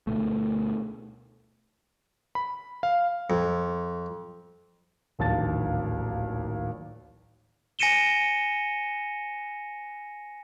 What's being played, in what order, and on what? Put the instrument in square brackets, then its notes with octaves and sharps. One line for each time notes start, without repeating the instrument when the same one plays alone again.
[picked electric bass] D2 B2 A3
[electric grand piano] B5
F5
[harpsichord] F2
[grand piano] D1 A#1 D#2 F5 A5 A6
[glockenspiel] G#5 A#6 C#7 D#7 E7 G7